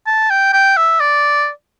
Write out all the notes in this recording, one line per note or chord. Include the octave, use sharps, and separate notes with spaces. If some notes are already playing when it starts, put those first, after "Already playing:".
A5
G5
G5
E5
D5